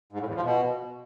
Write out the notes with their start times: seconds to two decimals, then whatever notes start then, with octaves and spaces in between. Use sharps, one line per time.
0.12 G#2
0.20 A2
0.28 E2
0.35 F3
0.43 B2